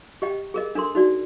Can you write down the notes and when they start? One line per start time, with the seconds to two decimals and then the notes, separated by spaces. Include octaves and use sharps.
0.22 G4 D#5 G5
0.54 G#4 A#4 D#5
0.75 D4 A4 A#4 C6
0.95 D#4 F#4 D5